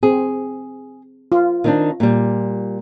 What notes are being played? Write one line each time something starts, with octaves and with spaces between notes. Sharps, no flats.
C4 G#4
F4
D#3 C4 D4
A#2 G3